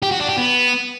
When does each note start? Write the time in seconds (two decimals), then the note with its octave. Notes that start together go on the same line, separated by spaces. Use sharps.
0.03 G4
0.11 F#4
0.20 D4
0.29 G4
0.37 B3